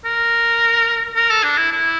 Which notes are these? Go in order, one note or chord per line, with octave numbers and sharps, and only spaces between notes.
A#4
A#4
A4
D4
E4
E4